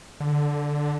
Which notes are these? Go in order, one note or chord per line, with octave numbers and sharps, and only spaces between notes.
D3